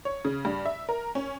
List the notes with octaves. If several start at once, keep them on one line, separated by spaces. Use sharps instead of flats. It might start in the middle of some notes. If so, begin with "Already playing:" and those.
C#5
C#3
G2
E5
A#4
C#4